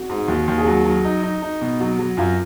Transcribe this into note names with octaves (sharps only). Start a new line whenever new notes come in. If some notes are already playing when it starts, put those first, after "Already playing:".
Already playing: F#4
G#2
D#2 F#4
D#2
G#4
F#3 F#4
F#3
D#4
D#4
D#4
B2
F#3 F#4
F#3
F#2 F4